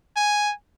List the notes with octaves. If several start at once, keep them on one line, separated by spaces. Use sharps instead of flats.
G#5